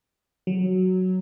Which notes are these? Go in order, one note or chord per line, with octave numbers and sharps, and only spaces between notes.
F#3